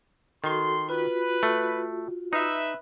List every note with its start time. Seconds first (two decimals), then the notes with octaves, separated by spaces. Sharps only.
0.44 D#3 F#4 A4 C6
0.89 F4 F#4 B4
1.43 A3
2.33 D#4 B4 E5